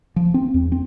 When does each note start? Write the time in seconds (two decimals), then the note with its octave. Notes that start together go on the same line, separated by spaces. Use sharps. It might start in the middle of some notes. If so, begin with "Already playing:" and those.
0.16 F3
0.34 C4
0.54 E2
0.72 C4